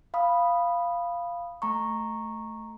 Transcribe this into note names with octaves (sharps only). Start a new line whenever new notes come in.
F5 B5 D#6
A3 A#5 C#6